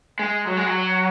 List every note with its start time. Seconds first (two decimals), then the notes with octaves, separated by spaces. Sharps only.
0.19 G#3
0.47 F#3
0.57 G#3
0.66 F#3